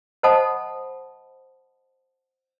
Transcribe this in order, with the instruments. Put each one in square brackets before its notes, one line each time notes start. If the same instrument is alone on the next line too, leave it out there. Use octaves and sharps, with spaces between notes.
[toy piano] C5 D#5 F#5 A5 B5 D#6